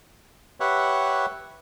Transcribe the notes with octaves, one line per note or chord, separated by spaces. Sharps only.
G4 B4 C#5 E5 F#5